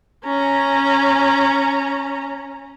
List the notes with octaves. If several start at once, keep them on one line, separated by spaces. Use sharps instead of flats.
C#4 A#5